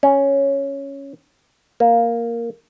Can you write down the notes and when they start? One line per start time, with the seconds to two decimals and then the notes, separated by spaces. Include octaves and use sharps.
0.03 C#4
1.80 A#3